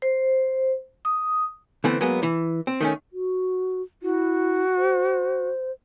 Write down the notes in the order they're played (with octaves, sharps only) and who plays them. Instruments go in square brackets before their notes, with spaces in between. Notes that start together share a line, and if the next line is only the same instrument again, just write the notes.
[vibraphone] C5
D#6
[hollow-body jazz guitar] D3 E3 A3 B3 C4
F#3 G#3 A#3 B3
E3
C4
D#3 A3 C#4
[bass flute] F#4
[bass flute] E4 [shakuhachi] F#4
[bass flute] C5